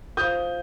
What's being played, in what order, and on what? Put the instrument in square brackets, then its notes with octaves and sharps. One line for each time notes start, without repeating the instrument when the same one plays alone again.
[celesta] F4 C5 F5 [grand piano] D#6 G6